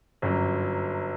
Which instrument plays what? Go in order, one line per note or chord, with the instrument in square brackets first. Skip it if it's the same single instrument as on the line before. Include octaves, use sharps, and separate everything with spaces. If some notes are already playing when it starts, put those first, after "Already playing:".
[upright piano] G1 F#2 F#3